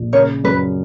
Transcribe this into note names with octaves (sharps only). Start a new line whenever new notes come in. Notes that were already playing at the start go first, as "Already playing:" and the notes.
Already playing: A#1
C#3 A#4 C#5
F#2 B4